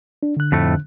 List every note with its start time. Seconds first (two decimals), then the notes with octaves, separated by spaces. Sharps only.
0.23 D4
0.37 D3 F#6
0.52 F2 A2 A3